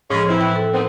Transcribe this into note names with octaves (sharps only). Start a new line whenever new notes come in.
A2 F3 G#3 C#4 C#5 B5
E3 C4 E4
G5 F#6
A4
D#3 B3 C4